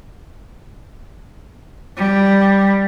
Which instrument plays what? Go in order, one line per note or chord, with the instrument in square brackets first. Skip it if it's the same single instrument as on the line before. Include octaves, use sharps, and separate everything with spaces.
[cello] G3